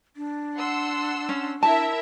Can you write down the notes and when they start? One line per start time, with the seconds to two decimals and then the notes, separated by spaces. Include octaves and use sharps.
0.16 D4
0.56 F#5 C6 E6
1.29 C#4
1.63 E4 A#4 E5 A5